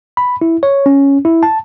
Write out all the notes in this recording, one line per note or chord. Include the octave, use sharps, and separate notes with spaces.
B5
E4
C#5
C#4
E4
A5